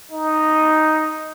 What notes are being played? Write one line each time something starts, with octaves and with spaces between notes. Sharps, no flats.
D#4